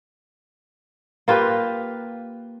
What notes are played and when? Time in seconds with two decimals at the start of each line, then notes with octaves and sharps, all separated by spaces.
1.28 A#3 F4 G4 B4